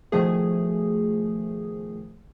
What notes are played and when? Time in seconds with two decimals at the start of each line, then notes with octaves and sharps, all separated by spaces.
0.12 B2 D#3 F3 A3 G#4